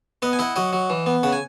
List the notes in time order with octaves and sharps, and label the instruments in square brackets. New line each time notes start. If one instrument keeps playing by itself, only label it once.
[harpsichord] B3 D#5 F#5
G#5
E4 D#5 F#5
F#3 D#5 F#5
F#3
E3
B3
C#3 F#5
G#5